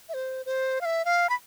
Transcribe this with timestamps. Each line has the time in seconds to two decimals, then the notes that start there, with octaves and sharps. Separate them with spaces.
0.09 E5
0.14 C5
0.46 C5
0.81 F5
0.85 E5
1.05 F5
1.29 B5